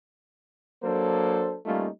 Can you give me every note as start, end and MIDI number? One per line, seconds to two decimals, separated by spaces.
0.83 1.57 54
0.83 1.57 58
0.83 1.57 62
0.83 1.57 69
0.83 1.57 72
1.66 1.89 55
1.66 1.89 57
1.66 1.89 58
1.66 1.89 61
1.66 1.89 63
1.66 1.89 65